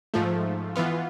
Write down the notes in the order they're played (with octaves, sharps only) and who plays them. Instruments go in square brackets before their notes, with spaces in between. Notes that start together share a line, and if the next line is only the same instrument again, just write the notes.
[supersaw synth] G#2 F3 A3
E3 B3 F4